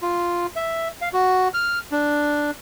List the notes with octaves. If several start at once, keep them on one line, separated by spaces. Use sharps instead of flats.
F4
E5
F5
F#4
F6
D4